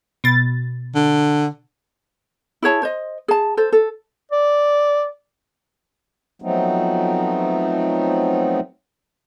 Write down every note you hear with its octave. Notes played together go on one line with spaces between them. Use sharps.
B2 A6
D3
E4 G#4 C#5 A5
C5 D#5
G#4 A5
A4 C5
A4
D5
F3 F#3 A3 B3 C4 D#4